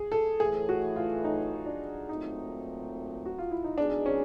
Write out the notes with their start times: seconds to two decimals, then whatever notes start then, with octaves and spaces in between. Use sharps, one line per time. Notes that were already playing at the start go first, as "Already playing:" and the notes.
Already playing: G#4
0.12 A4
0.40 A2 E3 A3 G#4
0.69 F#4
0.96 F4
1.24 D#4
1.66 D4
2.09 A#2 F#3 A3 C4 D#4
3.26 F#4
3.38 F4
3.51 E4
3.64 D#4
3.78 B2 G#3 B3 D4 D#4 G#4
4.06 C#4